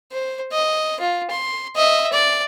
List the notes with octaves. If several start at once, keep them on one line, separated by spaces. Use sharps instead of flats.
C5
D#5
F4
C6
D#5 E5
D5